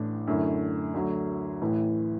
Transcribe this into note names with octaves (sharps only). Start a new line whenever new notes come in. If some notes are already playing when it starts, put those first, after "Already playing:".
Already playing: A1 A2 E3 D4
F#2 D3 A3 E4
D2 D3 F#3
A1 A2 E3